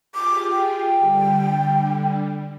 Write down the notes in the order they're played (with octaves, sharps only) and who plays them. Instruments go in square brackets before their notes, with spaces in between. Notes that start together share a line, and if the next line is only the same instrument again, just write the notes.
[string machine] F4 G4 G#4 [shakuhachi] D6
[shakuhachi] G5
[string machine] D3 G3